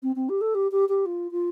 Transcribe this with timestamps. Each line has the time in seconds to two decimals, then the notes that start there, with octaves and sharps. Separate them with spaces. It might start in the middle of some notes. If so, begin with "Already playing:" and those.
0.03 C4
0.16 C4
0.29 G4
0.41 A4
0.55 G4
0.72 G4
0.89 G4
1.06 F4
1.31 F4